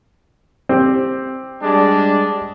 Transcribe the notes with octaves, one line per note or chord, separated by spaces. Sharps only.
C4 G4
G3 G#3 D4